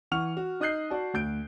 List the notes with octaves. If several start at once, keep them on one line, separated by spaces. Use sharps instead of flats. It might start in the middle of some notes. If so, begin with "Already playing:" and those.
E3 F#5 C#6 F6 F7
F#4
D#4 D#5 D#6 F#6 G6 C7
F#4 D5 A5
D2 G6 D7